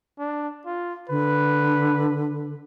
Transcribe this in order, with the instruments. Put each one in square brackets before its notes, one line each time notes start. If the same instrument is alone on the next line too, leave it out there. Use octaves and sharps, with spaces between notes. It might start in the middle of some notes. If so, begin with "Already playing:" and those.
[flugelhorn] D4
F4
[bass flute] D3 [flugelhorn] B4